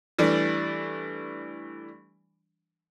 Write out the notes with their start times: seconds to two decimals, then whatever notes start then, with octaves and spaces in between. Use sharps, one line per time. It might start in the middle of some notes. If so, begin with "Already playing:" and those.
0.19 E3 G3 A3 D4